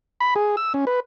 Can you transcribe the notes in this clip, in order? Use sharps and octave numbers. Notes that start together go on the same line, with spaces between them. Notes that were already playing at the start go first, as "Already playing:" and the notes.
B5
G#4
E6
C#4
B4